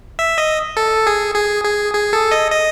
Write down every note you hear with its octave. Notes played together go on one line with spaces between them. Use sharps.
E5
D#5
A4
G#4
G#4
G#4
G#4
A4
D#5
D#5